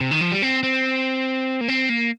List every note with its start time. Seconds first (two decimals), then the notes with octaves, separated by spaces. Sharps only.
0.01 C3
0.11 D#3
0.21 F3
0.32 G3
0.42 C4
0.63 C4
1.61 A#3
1.68 C4
1.89 A#3